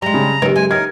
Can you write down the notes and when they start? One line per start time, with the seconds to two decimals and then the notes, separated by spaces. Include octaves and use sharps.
0.02 G3 G#3 A#5
0.14 C#3
0.42 F#1 D#3 G4 B4
0.56 G#3 G#5
0.71 D#4 A#4 G#6